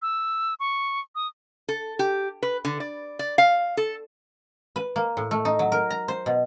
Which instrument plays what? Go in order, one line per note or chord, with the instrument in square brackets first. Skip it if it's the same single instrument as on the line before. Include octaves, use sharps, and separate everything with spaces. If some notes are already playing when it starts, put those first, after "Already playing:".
[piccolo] E6
C#6
D#6
[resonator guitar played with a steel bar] A4
G4
B4
D3
D5
D5
F5
A4
[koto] B4
A#3
A2
A3
D#4
F#3
A#4
A#5
C5
B2